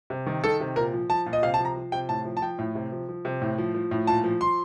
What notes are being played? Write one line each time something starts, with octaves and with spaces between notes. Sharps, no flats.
C3
D#3
D#3 A4
C3
A#2 A#4
F3
F3 A5
A#2
D#5
C3 F5
A5
F3
A#5
F3
C3 G5
A2 A5
F3
A5
F3 G5
A2
C3
F3
F3
C3
A2
F3
F3
A2
A#2 A5
F3
F3 C6